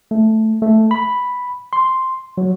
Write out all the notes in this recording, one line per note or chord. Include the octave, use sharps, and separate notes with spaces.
A3
A3
B5
C6
F#3